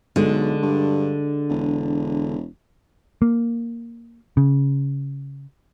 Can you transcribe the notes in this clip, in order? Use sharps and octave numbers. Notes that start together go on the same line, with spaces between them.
B1 D3 G#3
G2
E1
A#3
C#3